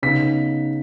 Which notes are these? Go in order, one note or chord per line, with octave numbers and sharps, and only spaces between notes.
C#3 B3 D#4 B6